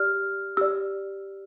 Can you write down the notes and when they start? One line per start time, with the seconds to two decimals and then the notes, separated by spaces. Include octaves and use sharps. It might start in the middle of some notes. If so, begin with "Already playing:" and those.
Already playing: G4 D5 F6
0.57 G4 D5 E6